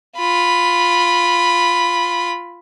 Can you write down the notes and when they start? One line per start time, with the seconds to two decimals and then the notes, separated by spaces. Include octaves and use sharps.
0.18 F4 B5